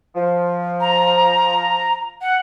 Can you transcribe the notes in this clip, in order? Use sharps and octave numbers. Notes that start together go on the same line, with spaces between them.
F3
A#5
F#5